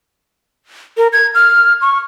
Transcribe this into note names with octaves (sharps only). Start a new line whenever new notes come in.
A#4
G#6
F6
C#6